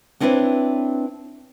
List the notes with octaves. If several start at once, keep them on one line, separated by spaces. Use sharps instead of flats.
B3 C4 D4 E4 B4 C#5